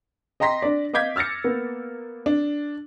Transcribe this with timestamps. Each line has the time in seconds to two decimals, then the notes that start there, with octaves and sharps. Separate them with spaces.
0.40 D#5 G5 A#5 C6 A#6 B6
0.62 D4 D5
0.94 D#5 F5 D6 G6 G#6 B6
1.16 E6 F6 A6 A#6 C#7
1.44 A#3 B3
2.26 D4